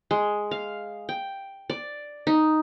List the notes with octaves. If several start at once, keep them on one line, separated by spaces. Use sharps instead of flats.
G#3
F5
G5
D5
D#4